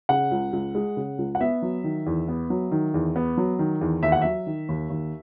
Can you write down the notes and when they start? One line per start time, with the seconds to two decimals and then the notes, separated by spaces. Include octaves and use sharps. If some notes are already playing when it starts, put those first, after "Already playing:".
0.09 C#3 F#5
0.31 C#2
0.53 C#2
0.75 G#3
0.97 C#3
1.18 C#2
1.35 F#5
1.40 B3 E5
1.62 F#3
1.84 D#3
2.06 E2
2.28 B3
2.50 F#3
2.71 D#3
2.94 E2
3.16 B3
3.38 F#3
3.59 D#3
3.81 E2
4.03 D#2 E5
4.12 F#5
4.22 F#3 E5
4.47 D#3
4.69 D#2
4.90 D#2